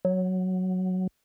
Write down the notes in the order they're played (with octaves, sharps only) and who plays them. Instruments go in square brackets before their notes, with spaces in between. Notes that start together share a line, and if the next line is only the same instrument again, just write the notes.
[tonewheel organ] F#3